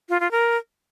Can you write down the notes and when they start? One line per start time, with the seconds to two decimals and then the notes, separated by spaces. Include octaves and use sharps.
0.09 F4
0.20 F4
0.31 A#4